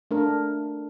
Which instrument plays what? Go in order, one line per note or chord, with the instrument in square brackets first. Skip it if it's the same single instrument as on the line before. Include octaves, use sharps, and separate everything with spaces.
[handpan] A3 D4 A#4